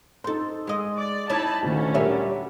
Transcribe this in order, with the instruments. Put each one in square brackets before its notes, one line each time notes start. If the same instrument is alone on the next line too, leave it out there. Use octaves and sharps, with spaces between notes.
[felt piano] D#4 C6 [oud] A4 C5
[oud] G#3 D#5
[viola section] D5
[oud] D#4 E4 [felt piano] C#5 G#6 [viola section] A5 B5
[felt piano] D2 A#2 D#3 [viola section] D3 C#4
[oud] A#2 F#3 G3 [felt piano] A#4 C#5 E5